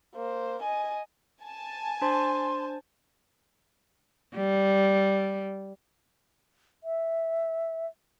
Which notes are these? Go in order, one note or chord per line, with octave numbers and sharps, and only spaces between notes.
A#3 C5
D#5 G#5
G#5 A5
D4 C5 C6
G3
E5